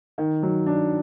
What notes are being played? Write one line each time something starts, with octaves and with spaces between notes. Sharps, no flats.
D#3
F#3
D4